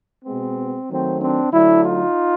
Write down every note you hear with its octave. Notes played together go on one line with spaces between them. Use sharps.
B2 G#3 B3 C4
D#3 F#3 A3 C4
C4 D4
D3 F#3 A3 D4 E4
D#4 F4